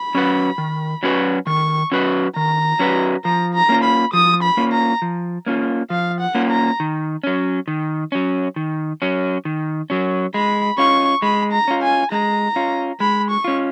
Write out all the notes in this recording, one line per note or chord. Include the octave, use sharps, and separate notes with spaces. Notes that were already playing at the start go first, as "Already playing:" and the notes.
Already playing: B5
F#3 C#4 F#4 B4
D#3
F#3 C#4 F#4 B4
D#3 C#6
F#3 C#4 F#4 B4
D#3 A#5
F#3 C#4 F#4 B4
F3 A#5
A#5
A#3 C#4 F4
B5
F3 D#6
B5
A#3 C#4 F4
A#5
F3
A#3 C#4 F4
F3 F5
F#5
A#3 C#4 F4
A#5
D#3
F#3 C#4
D#3
F#3 C#4
D#3
F#3 C#4
D#3
F#3 C#4
G#3 B5
C#4 F4 C#6
G#3 B5
A#5
C#4 F4
G#5
G#3 A#5
C#4 F4
G#3 B5
C#6
C#4 F4